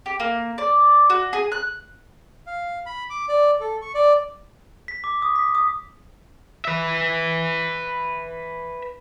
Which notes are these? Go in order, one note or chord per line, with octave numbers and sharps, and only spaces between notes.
G4
A#3
D5
F#4
G#4
F#6
F5
B5
D6
D5
A4
C#6
D5
B6
D6
D#6
B6
D#6
B4 E5